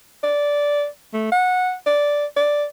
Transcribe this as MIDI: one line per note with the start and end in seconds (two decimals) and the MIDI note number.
0.24 0.86 74
1.13 1.31 57
1.32 1.74 78
1.86 2.26 74
2.36 2.65 74